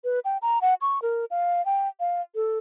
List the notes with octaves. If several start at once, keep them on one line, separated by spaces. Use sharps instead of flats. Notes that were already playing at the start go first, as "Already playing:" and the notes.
B4
G5
A#5
F#5
C#6
A#4
F5
G5
F5
A4